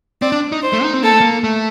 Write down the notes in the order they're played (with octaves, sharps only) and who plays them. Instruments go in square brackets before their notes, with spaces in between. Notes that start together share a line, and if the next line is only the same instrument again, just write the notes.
[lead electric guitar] C4 [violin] D5
[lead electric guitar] D4
D#4
[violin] C5
[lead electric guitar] A3
D#4
C4
[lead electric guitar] A#3 [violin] A4
[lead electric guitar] A3
A#3
A3